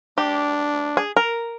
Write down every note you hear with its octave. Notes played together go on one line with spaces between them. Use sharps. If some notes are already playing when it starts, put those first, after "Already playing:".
D4 G4
G#4
A#4